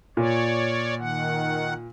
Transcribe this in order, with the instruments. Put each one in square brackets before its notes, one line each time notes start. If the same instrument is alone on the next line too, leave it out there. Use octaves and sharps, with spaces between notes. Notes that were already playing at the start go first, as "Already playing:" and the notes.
[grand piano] A#2 [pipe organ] C#5 D5
[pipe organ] D#3 F#5